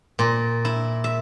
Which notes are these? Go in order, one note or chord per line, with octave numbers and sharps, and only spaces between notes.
A#2
E4
E5